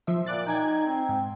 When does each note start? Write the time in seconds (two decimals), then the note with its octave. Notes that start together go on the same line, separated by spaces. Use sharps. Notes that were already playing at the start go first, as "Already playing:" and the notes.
0.07 F3 E5
0.26 A#2 D6 F#6 A6
0.47 D#4 G5 G#5 G#6
0.87 C4
1.09 G#2